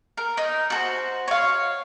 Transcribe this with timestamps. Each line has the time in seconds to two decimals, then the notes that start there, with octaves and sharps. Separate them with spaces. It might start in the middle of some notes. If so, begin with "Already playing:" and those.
0.17 A#4
0.37 D#4
0.70 F#4 A4 C5
1.28 C#5 F5